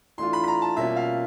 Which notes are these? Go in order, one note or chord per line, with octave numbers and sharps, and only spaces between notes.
E3 A3 D4 F4 C6
B5
B5
A#5
A5
B2 G3 A#3 C#4 F4 E5
F5